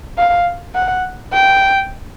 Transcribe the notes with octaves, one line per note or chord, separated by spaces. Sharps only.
F5
F#5
G5